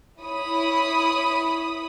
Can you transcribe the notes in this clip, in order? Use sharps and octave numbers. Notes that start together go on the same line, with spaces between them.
E4 C#5 B5 D#6